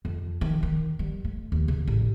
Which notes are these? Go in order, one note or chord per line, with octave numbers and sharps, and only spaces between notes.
F2
D#3
D#3
G3
A3
D#2
C#3
A1